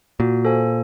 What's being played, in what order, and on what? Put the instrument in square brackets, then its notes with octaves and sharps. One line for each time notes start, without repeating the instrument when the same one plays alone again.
[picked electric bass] A#2 [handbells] F#4
[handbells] A4 C5 F5 G#5